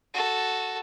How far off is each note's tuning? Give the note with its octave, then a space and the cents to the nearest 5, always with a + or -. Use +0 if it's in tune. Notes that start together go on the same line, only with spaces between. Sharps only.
F#4 +0 A4 +0